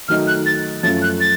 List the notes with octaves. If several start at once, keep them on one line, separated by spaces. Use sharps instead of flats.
D#3 F#3 A3 D#4 F6
F#6
A6
F#2 F3 A3 C#4 F4 A6
F#6
A6